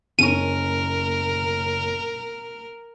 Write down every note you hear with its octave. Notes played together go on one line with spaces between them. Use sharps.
F#1 C#4 A#4 C#6 D#7